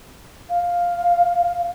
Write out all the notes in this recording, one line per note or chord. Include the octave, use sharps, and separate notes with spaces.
F5